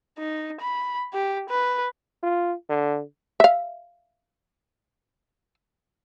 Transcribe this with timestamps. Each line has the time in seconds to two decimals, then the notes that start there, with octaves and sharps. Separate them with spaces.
0.19 D#4
0.61 B5
1.13 G4
1.49 B4
2.23 F4
2.70 D3
3.40 E5 F5